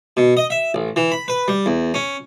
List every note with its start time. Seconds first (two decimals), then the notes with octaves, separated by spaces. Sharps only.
0.17 B2
0.37 D#5
0.50 E5
0.74 A1
0.96 E3
1.12 B5
1.28 B4
1.48 G3
1.66 E2
1.94 C#4